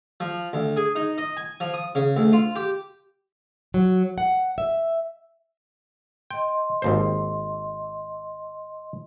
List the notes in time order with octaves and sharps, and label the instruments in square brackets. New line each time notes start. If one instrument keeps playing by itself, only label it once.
[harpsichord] F3
D2
G#4
D#4
D#5
G#5
F3
D#6
C#3
D2
F4
G4
[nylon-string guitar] F#3
F#5
E5
[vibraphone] D#5 C6 [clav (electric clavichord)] G5
[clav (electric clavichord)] G#1 D#2 C5